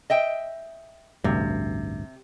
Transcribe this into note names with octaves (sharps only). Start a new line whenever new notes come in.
D#5 E5 G5
A1 D2 G2 C3